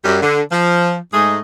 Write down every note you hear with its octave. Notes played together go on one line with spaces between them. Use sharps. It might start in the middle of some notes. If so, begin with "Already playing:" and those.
F#2 G3
D3
F3
G#2 G#3 A3 D#4 G#4 D#5